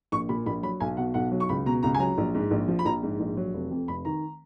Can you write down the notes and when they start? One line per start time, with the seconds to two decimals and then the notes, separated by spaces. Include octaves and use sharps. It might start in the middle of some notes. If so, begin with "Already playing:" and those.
0.12 A#1 C#6
0.29 A#2 B5
0.46 A#1 B5
0.63 F#3 B5
0.80 B1 G#5
0.97 B2 F#5
1.14 B1 F#5
1.32 F#3
1.40 C#6
1.49 C#2 B5
1.66 B2 A#5
1.83 C#2 A#5
1.95 G#5
2.00 F#3 A#5
2.18 A#1
2.35 G#2
2.51 A#1
2.68 F3
2.79 B5
2.85 A#1 A#5
3.03 G#2
3.20 A#1
3.37 F#3
3.54 F1
3.71 F2
3.88 F1 B5
4.05 D#3 A#5